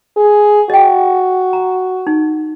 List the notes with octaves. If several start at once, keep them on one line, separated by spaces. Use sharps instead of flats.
G#4
F#4 D#5 G5
A#5
D#4